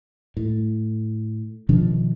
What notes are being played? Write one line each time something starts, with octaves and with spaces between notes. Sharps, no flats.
A2
B2 D#3 F3 D4